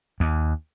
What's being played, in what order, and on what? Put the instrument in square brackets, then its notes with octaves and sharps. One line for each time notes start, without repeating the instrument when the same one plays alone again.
[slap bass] D#2